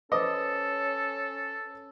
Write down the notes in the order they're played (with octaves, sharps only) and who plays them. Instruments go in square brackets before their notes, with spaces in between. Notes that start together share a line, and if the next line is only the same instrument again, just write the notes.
[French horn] C#4 [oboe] A4 [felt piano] B4 C5 D6 [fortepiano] D#5